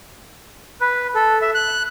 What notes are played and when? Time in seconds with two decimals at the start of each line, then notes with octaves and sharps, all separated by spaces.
0.81 B4
1.15 A4
1.42 E5
1.55 F#6